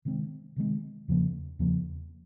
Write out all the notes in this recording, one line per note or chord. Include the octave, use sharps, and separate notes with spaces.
C3 D#3 G#3 C4
C3 D#3 G#3 C4
E2 C#3 F3 A#3
E2 C#3 F3 A#3